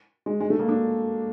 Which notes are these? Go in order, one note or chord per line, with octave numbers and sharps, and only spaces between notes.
G#3
G#3
A3
A#3
D4